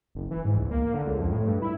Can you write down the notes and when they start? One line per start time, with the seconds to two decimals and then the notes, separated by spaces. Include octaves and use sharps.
0.15 F#1
0.31 E3
0.45 G#2
0.57 C#2
0.71 A#3
0.94 D3
1.06 C#2
1.20 F2
1.32 A2
1.46 G2
1.62 E4